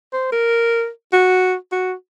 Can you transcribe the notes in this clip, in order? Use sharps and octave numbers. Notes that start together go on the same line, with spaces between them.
C5
A#4
F#4
F#4